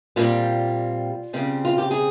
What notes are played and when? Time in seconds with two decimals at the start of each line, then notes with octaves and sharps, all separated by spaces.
0.16 A#2 G3 C4 F4
1.33 C#3 G3 C4
1.65 F4
1.78 G4
1.91 G#4